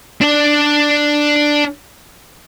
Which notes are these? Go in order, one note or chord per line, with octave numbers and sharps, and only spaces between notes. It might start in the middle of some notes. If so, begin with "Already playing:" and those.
D4 D5